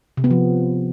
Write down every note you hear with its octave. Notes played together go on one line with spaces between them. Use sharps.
C3
B3
F3